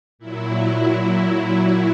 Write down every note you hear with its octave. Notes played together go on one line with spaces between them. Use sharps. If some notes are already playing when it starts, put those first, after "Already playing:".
A#2 F#3 E4
E4